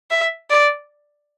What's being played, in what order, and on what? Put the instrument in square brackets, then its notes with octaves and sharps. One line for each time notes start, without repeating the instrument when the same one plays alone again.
[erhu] E5
D5